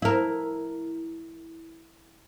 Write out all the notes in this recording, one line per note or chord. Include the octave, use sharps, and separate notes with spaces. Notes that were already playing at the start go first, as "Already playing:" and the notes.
E4 A#4